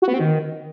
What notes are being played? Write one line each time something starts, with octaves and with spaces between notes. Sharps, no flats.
F#4
B3
C4
D#3